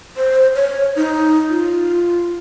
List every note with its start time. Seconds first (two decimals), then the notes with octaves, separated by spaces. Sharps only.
0.17 C5
0.55 C#5
0.96 D#4
1.49 F4